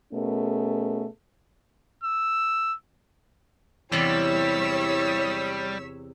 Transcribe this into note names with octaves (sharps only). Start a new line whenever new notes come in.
B2 A3 C#4 G#4 A#4
E6
E2 C3 G3 E4 C#5 D5 E6 B6